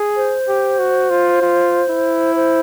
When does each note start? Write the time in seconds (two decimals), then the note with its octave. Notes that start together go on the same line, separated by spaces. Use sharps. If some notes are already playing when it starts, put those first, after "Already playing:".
Already playing: G#4
0.16 C5
0.48 G4
0.79 F#4
1.11 F4
1.42 F4
1.89 E4
2.36 C5